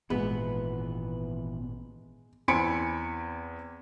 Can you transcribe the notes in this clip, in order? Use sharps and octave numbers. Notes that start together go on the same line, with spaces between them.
G#1 E2 A#2 G#3 B3 B4
E2 C4 G#5 B5 C#7 D7